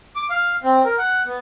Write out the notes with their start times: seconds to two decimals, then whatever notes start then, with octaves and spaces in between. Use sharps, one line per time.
0.16 D6
0.30 F5
0.64 C4
0.85 A#4
0.98 F#5
1.27 B3